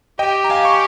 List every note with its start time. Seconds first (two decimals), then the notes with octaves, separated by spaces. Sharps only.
0.19 G4 D#5 G5
0.44 A#5
0.50 F5 G#5
0.65 C#6